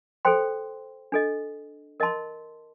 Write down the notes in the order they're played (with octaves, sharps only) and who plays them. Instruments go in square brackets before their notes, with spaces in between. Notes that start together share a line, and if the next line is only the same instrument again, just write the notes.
[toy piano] A4 C5 G5 C6
D4 A4 D#5
A#4 D#5 A5 C6